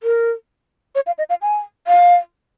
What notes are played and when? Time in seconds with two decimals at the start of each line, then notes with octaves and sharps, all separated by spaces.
0.03 A#4
0.95 C#5
1.06 F5
1.18 D#5
1.29 F5
1.42 G#5
1.87 F5